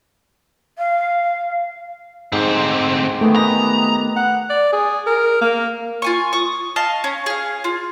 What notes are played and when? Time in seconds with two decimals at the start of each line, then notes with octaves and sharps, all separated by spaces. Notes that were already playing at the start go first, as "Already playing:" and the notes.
0.78 F5
2.32 D2 G#2 C4 G4
3.21 D#3 A3 B3 G#4
3.36 G4 B4 D#5 A#5
4.16 F#5
4.50 D5
4.73 G#4
5.07 A#4
5.41 A#3
6.02 F4 G#5 C#6
6.33 C#6 D#6
6.76 D#5 F5 A5 C#6
7.04 C#4
7.26 G#4 F5
7.64 F4